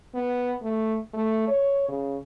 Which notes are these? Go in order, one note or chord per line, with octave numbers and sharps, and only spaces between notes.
B3
A3
A3
C#5
C#3